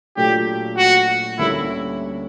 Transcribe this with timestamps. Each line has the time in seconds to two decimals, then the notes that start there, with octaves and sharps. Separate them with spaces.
0.16 A#2 F#3 A3 D4 F4 G4
0.78 F#4
1.39 D2 D3 G3 A#3 C#4 E4